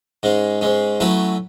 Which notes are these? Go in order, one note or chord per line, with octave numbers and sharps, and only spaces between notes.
G#2 G#3 C#4
G#2 G#3 C#4
F#3 A3 C#4 E4 B4